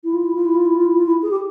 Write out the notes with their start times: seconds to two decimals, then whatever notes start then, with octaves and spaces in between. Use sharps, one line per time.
0.04 E4
0.13 F4
0.24 E4
0.34 F4
0.45 E4
0.55 F4
0.65 E4
0.74 F4
0.84 E4
0.95 F4
1.06 E4
1.22 G#4
1.30 G4